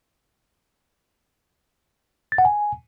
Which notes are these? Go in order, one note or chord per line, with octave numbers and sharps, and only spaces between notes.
A6
F#5
G#5